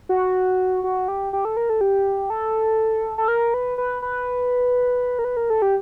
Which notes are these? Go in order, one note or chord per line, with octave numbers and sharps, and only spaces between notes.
F#4
F#4
G4
G4
A4
A#4
A4
G4
A4
A4
A#4
B4
B4
B4
A#4
B4
A#4
A4
G4